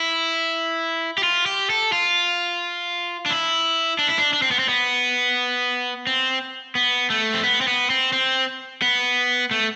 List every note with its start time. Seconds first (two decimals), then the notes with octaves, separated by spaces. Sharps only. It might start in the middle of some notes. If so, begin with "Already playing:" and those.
Already playing: E4
1.18 G4
1.23 F4
1.46 G4
1.70 A4
1.92 F4
3.26 D4
3.31 E4
3.99 D4
4.09 E4
4.19 D4
4.33 D4
4.42 C4
4.51 B3
4.59 C4
4.69 B3
6.07 C4
6.75 B3
7.10 A3
7.33 C4
7.44 B3
7.61 C4
7.68 B3
7.90 C4
8.13 C4
8.82 B3
9.51 A3